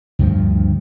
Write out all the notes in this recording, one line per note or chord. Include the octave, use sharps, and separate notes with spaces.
D2 G2 D#3 F3